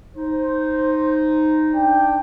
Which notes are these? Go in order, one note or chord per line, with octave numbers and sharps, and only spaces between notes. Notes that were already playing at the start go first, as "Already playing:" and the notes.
D#4 C5
D4 G5